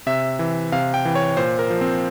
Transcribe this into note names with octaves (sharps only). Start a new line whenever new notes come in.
C3 E5
E3
C3 F5
G5
E3
C#5
A#2 C5
A#4
F3
C4